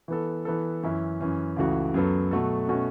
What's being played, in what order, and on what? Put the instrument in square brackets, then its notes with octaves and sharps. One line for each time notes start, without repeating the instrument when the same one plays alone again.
[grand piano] E3 B3 A4
E3 B3 A4
F#2 E3 C#4 E4
F#2 E3 C#4
C#2 C#3 E3 A3 F#4
F#2 F#3 B3 A4
B2 F#3 A3 F#4 A4
B2 A3 C#4 F#4